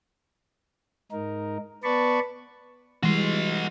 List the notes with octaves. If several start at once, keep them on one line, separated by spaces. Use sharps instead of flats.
G#2 D#4 A#4
B3 B4 D5 A5 B5 C#6
E3 G3 G#3 F#4 C6